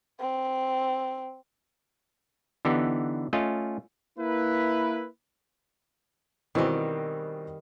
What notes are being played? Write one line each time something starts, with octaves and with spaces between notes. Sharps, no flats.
C4
D3 E3 B3 D#4 G4
A3 C#4 F4 D#5
A#3 E4 B4
B2 D#3 E3 G3 C4